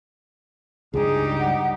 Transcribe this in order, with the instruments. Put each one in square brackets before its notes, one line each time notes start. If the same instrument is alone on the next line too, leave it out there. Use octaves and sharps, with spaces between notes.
[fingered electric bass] C#2 G2 [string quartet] G3 D#4 G4 [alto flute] G#4
[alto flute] F#5